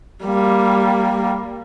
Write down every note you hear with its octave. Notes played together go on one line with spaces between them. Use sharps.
G3 A#3